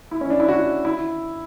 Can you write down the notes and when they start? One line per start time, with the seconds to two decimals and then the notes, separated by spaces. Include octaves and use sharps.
0.11 E4
0.21 C#4
0.30 D4
0.40 E4
0.48 F#4
0.85 E4